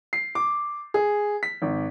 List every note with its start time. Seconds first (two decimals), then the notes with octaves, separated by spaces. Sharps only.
0.13 C7
0.35 D6
0.94 G#4
1.43 B6
1.62 G#1